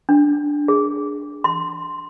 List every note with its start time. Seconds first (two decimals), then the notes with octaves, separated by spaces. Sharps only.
0.09 D4
0.68 G#4
1.44 C6